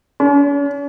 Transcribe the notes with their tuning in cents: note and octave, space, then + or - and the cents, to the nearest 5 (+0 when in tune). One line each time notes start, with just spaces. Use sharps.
C#4 +45